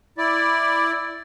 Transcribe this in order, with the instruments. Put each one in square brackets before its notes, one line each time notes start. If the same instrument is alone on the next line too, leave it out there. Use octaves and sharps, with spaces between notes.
[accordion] E4 D5